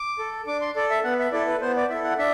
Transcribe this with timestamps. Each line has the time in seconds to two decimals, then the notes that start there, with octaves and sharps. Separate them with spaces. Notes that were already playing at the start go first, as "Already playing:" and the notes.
Already playing: D6
0.19 A4
0.47 D4 D6
0.61 C6
0.76 A4 D5
0.90 E5
1.04 B3 F#5
1.19 E5
1.32 E4 A4 D5
1.47 B4
1.61 B3 C5
1.76 D5
1.90 E4 A4 E5
2.04 F#5
2.18 D4 E5